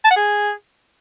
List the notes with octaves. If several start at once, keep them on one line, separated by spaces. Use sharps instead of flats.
A5
F#5
G#4